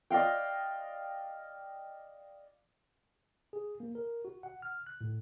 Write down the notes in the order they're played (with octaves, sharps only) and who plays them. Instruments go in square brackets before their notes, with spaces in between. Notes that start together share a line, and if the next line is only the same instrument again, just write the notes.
[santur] D5 D#5 F5 G5
[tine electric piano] G#4
A#3
A#4
F#4
F#5
F6
F#6
A2